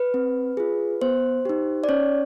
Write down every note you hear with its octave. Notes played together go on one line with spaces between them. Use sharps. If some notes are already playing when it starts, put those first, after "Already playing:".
Already playing: B4
C4
F4 G#4
B3 C5
D#4 G4
D5
C#4 C#5